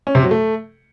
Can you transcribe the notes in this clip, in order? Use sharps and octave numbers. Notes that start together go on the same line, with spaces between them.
C#4
C3
F#3
A3